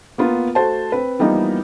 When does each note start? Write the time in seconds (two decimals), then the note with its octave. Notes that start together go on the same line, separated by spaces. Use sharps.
0.18 A#3 B3 F4
0.55 A3 F#4 C5 A5
0.92 C4 B4
1.19 E3 F3 G3 A#3 B3 D#4